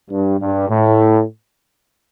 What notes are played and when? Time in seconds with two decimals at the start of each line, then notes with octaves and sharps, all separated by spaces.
0.10 G2
0.40 G2
0.69 A2